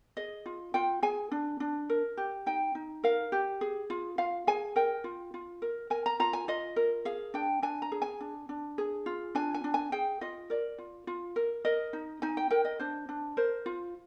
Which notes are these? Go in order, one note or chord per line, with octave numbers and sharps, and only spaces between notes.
G#4 D#5
F4
F4 G5
G#4 G#5
D4
D4
A#4
G4
D#4 G5
D#4
A#4 F5
G4
G#4
F4
F4 F5
G#4 G#5
A#4 G5
F4
F4
A#4
A#4 G#5
A#5
F4 A#5
G#5
F4 D#5
A#4
G#4 F5
D4 G5
D4 G#5
A#5
G#4
G#5
D4
D4
G#4
F4
D4 G#5
G#5
D4
G#5
G#4 G5
F4 D#5
A#4 D5
F4
F4
A#4
A#4 D#5
D#4
D#4 G#5
G5
A#4 G5
D#5
D4 C5
D4
A#4 C5
F4